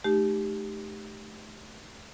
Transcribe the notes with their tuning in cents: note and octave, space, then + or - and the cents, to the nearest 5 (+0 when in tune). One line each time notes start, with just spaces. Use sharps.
A3 -30 D#4 -25 G4 +0